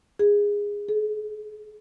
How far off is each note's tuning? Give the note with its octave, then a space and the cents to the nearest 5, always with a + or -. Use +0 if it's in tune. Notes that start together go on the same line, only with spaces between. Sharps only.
G#4 -15
G#4 +40